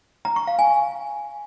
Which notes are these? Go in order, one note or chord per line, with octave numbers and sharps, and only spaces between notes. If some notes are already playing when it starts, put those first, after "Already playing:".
A#5
C#6
F5
G#5